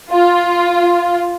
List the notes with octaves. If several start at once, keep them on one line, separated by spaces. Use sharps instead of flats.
F4